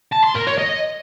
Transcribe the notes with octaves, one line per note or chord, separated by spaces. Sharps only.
A5
C6
A#4
C#5
D#5